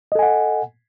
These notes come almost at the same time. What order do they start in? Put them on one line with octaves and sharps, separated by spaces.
D#5 A4 G#5 F#5